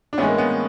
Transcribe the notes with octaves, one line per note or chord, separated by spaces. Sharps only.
D4
A2 E3 G#3 B3 C#4
A#3
B3